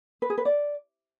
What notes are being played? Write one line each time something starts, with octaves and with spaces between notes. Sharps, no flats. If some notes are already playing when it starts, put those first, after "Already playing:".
B4
G#4
B4
D5